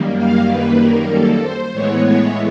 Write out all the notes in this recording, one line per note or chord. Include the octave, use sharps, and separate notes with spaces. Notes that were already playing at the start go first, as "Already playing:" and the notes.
Already playing: F#2 D#3 G3 A#3
F5
B4
A#4
A4
C5
A2 E3 G#3 B3 C#5
C#5